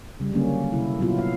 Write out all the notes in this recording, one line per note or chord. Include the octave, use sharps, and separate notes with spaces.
C#3 G3
D3 F#3 A#3 C#4
C3 E4
A#2 F#3 B3 E4 F4
F5